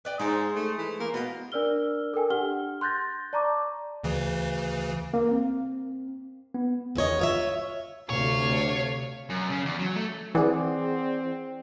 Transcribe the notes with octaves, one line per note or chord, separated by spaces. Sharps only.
B4 D5 G5
G#2 G#3 C5
A3
E3
A#3
B2 B3 F5
D4 A#4 D5 E6 F6 G7
A4 A#4 G5 G#5
D4 G4 F#5 F6 G7
C6 F#6 G6 A6 A#6
D5 A5 A#5 C#6 D6
D2 C#3 E3
A#3
C4
B3
E2 D#3 C#5 D#5
F4 C#5 E5
D2 C3 A3 C#5 F5
F#2
C#3
E2
F#3
A3
E3 C4 G#4 D5 F#5